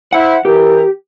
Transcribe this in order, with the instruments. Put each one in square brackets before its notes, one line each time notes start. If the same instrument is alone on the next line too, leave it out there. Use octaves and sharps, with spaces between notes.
[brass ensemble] E4 C5 E5 [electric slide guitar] F#5
[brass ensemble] E3 A#4 [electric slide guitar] G4